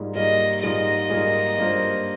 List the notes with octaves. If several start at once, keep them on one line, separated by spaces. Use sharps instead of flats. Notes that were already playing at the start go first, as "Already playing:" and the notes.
Already playing: G#2 G3 A#3 F4 G#4
G#2 G3 A#3 F4 G#4 D#5
G#2 G3 A#3 F4 G#4 D#5
G#2 G3 A#3 F4 G#4
G2 G3 A#3 F4 C5